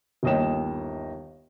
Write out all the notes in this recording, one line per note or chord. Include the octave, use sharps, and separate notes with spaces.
G1 D#2 D#5 G5 E7